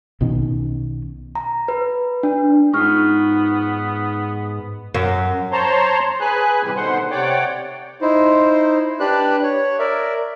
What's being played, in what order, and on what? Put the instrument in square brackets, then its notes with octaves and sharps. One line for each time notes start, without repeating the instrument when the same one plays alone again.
[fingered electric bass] B1 B2 D#3 C#4
[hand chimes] A#5
B4
D4
[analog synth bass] G#2 [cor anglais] B3 [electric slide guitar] D#4 F4 [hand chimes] C#6 F6
[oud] F#2
[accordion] C5 C#5 A5 A#5 C6
G#4 B4 G#5 F#6
A2 C3 E3 G3 G4
B2 D3 D#3 C5 F#5 C6
C3 C#5 D5 F#5 G5 D6
[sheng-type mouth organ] D#4 E4 C5
D4 G4 B4 D5 F#6
C#5
A#4 D5 E5